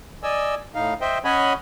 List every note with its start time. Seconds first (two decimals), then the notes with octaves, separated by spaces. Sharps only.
0.23 D5 D#5 G#5 E6
0.75 A2 D#4 F5
1.01 C5 D#5 E5 G5
1.24 C#4 C#5 D#5 F#5 G#5 B5